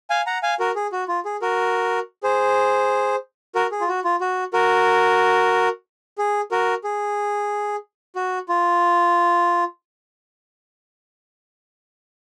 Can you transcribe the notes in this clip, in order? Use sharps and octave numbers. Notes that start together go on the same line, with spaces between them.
F5 G#5
F#5 A#5
F5 G#5
F#4 A#4
G#4
F#4
F4
G#4
F#4 A#4
G#4 C5
F#4 A#4
G#4
F4
F#4
F4
F#4
F#4 A#4
G#4
F#4 A#4
G#4
F#4
F4